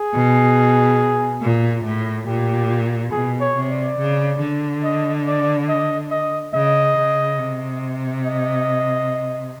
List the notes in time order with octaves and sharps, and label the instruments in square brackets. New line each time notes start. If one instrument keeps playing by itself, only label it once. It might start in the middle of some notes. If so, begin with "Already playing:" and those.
Already playing: [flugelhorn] G#4
[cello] B2
A#2
A2
[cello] A#2 [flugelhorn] G4
[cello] B2 [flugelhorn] G#4
[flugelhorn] C#5
[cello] C3
[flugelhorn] D5
[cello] C#3
D3
[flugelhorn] D#5
D5
D#5
D#5
[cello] C#3 [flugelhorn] D#5
[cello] C#3
C3
[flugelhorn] D#5